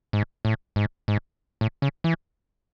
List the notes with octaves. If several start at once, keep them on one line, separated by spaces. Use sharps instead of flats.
G#2
A2
G#2
G#2
A2
C#3
E3